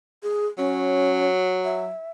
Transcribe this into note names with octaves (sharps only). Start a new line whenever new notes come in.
G#4
F#3 C#4
E5